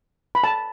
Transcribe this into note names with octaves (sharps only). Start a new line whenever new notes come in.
B5
A5